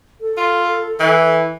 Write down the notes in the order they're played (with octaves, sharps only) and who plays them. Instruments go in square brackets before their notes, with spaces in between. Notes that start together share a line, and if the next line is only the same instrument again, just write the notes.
[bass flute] A4
[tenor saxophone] F4
E3